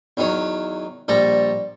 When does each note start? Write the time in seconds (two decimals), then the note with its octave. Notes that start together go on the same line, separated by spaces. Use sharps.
0.17 E2 D#3 F#3
1.08 A#1 G3 A4 A#5